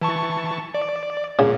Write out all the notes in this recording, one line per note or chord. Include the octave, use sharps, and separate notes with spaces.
E3 A5 C#6
D5
A#2 C#3